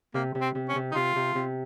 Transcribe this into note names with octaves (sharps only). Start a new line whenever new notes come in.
C3 A#3
C3
C4
C3
C#4
C3
D#4
C3 F4
C3
C3